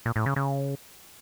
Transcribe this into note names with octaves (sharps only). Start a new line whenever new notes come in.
A#2
A2
C#3
C#3